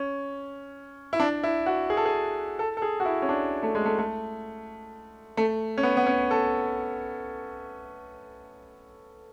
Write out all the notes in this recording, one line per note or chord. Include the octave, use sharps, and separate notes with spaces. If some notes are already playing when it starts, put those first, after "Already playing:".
Already playing: C#4
E4
D4
E4
F#4
G#4
A4
G#4
A4
A4
G#4
F#4
E4
C#4
D4
A3
G#3
A3
A3
A3
C#4
B3
B3
C#4
A4